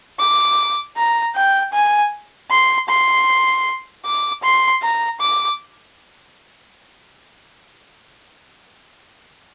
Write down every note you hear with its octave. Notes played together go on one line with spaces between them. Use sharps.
D6
A#5
G5
G#5
C6
C6
D6
C6
A#5
D6